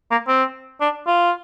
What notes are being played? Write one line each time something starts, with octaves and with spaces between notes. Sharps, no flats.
A#3
C4
D4
F4